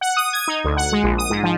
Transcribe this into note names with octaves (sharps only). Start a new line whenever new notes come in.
F#5
D#6
G#6
D#4
D2
F#5
G#3
A#1
D#6
G#2
F3